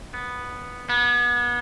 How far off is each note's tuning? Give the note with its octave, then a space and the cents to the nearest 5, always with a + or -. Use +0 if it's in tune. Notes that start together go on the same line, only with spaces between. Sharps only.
B3 +0
B3 -30